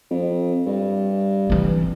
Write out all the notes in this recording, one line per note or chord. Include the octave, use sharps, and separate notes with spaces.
F2
G2
E3 C4